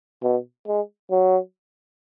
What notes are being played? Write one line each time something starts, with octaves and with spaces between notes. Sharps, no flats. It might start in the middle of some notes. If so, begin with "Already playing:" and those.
B2
G#3
F#3